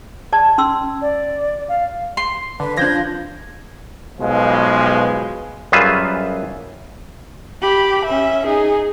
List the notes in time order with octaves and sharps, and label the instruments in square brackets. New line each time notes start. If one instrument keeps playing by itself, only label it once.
[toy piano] D5 A5
C#4 C6 E6
[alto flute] D5
F5
[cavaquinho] C6
[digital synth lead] D3 [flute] B4
[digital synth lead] F3 [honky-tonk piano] D4 G6 A#6 [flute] G#6
[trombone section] B1 B2 F3 G#3
[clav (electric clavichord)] F#2 G3 F4 G#4 B4 E5
[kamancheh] G4 B5
C#4 E5
D#4 G#4